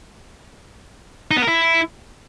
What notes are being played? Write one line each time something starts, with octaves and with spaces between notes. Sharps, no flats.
D#4
B3
A#4
E4